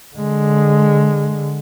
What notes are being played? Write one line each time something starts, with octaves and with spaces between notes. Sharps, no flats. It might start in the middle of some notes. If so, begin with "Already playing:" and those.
D3 G#3